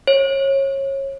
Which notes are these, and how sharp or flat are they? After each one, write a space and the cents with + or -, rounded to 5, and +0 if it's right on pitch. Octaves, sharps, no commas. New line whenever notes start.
C#5 -25